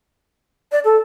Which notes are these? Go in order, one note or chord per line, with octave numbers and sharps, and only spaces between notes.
D5
A4